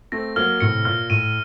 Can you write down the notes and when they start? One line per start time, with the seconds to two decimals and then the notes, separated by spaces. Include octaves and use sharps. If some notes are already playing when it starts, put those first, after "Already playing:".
0.12 A3 C4 A#6
0.36 F#3 A#3 F6
0.60 A2 C3 C#7
0.85 A#2 F6
1.10 A2 D#7